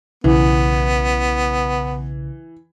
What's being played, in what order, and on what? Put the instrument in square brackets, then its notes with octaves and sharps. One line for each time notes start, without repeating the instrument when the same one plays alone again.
[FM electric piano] B1 C#3 [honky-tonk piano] E3 [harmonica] B3